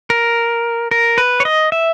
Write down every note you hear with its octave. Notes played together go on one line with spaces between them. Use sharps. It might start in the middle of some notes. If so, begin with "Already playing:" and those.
A#4
A#4
B4
C#5
D#5
E5